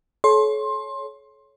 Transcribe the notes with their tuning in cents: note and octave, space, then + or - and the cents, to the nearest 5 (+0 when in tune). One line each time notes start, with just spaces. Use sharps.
A4 -40 C#5 +0 C6 +20